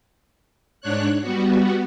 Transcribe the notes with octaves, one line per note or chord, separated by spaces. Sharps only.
G#2 D4 C#5 F#6
G3 B3 F#4